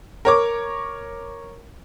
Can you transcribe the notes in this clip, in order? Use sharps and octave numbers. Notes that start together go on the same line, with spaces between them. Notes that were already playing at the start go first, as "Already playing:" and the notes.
A#4 C#5 D6